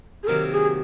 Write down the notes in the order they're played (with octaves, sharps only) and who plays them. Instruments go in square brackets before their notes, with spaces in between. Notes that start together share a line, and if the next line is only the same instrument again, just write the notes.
[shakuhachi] G#4
[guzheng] C3 D#3 F#3 A#3 [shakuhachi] A#4
[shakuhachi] G#4